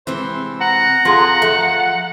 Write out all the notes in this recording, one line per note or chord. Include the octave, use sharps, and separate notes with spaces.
C3 E3 G#3 C4 C5
F#5 A#5
F3 F4 G#4 A4 F#5
F3 A3 E5